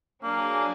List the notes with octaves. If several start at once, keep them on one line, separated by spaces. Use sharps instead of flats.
F#3 A#3 D4 G#4